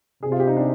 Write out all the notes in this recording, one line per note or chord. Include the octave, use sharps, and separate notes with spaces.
C3 G#4
F4
G4
D#4
D4